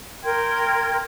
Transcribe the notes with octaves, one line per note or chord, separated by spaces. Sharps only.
A#4 G5 C6 G#6